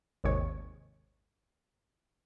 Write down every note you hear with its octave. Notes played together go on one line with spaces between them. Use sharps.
G#1 D#2 C3 G#3 C#5